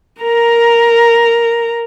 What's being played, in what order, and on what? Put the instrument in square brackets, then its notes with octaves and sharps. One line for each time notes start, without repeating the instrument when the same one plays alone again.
[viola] A#4 A#5